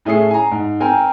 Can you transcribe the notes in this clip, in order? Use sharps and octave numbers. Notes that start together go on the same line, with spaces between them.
A2 A3 C#4 G#4 D#6 C7
G#5 A#5
G#2
C4 A#4 G5 G#5